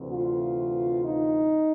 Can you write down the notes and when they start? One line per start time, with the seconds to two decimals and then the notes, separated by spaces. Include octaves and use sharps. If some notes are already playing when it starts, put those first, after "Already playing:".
Already playing: D2 C3 E3
0.09 F4
1.03 D#4